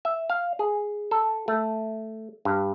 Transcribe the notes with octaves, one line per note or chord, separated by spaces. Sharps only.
E5
F5
G#4
A4
A3
G2